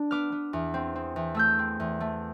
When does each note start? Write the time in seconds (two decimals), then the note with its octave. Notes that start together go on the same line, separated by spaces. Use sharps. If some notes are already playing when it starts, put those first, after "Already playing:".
Already playing: D4
0.11 B3 D6 F6
0.32 B3
0.53 E2
0.74 C4
0.95 C4
1.16 E2
1.35 A3 E6 G6
1.59 C4
1.80 E2
2.00 A3